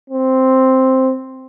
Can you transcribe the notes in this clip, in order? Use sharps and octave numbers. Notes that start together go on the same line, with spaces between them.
C4